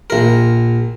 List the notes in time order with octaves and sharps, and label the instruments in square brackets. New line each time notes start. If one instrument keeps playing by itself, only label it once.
[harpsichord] A#1 A#4